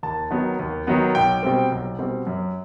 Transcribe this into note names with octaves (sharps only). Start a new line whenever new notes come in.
D#2 A5
D#3 F#3 B3
D#2
D#3 F#3 B3
B1 G5
B2 G3 C4
B1
B2 G3 C4
F#2